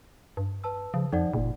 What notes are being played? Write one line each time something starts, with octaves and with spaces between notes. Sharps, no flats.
G2
B4 A5 E6
C#3 F3
F2 F3 D#4 D5 F#5
F#1 A#2